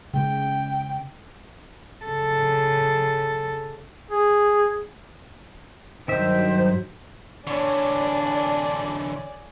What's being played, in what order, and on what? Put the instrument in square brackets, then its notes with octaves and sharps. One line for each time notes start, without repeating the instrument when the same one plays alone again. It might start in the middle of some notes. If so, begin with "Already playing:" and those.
[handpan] C#3 G#3 [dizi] G5
[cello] C#3 A4
[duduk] G#4
[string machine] G2 F#3 [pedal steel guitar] D#3 E5 [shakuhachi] C5
[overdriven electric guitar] D3 E3 [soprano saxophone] D4 [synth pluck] C#5 [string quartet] D5 G#5